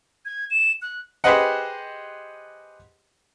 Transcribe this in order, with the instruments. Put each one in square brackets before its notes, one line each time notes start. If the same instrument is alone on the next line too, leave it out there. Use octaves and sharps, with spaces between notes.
[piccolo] G#6
E7
F#6
[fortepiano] G4 G#4 B4 C5 D#5 F#5